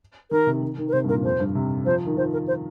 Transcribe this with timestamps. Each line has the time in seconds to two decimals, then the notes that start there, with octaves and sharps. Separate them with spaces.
0.31 D#3 A#4
0.47 C3
0.62 D#3
0.78 D#3
0.88 A#4
0.93 C3 C5
1.04 G2
1.09 A#2 A#4
1.24 F2 C5
1.40 G2
1.55 C3
1.86 F3 C5
2.06 D#3
2.17 F3 C5
2.33 A#4
2.48 C5